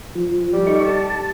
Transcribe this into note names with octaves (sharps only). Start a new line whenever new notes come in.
F3
G3
D#4 A4 C#6
A5